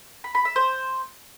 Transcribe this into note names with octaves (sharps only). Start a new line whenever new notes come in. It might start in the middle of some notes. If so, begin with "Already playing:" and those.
B5
B5
E5
C5